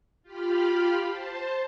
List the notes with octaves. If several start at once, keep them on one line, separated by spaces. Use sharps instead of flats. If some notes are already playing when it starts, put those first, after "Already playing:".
F4 G4 F5 B5
C5 A5